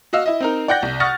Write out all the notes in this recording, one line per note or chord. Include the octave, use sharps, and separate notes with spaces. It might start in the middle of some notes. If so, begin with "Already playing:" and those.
F#4 D#5 F5 E6
E4 D#5
C4 D#4 A#4
D5 F#5 G5 F#6 G6 A#6
C2
F#5 C#6 D#6 F6 A6 A#6